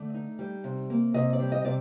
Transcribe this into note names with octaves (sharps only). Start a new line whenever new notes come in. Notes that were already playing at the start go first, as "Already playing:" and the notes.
Already playing: D3 A3 D5
D#4
G3
C3
A#3
C3 D#5
D5
G3
D#5
C3 D5